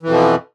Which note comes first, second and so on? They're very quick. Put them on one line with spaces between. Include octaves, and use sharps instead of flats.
E3 F2 B2 F3